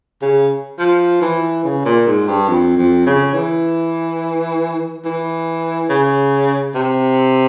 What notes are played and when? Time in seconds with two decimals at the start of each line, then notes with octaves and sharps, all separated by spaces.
0.22 C#3
0.79 F3
1.21 E3
1.64 C#3
1.85 A#2
2.07 G#2
2.28 G2
2.49 F2
2.77 F2
3.06 C#3
3.34 E3
5.05 E3
5.90 C#3
6.75 C3